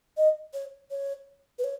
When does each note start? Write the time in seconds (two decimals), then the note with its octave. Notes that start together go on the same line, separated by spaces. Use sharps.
0.17 D#5
0.54 C#5
0.91 C#5
1.58 B4
1.64 C#5